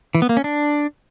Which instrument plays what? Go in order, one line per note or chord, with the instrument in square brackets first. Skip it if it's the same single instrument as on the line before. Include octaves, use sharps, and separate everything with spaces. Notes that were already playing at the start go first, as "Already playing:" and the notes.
[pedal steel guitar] E3
B3
A#3
C#4
D4